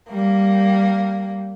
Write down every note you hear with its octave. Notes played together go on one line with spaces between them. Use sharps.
G3 A#3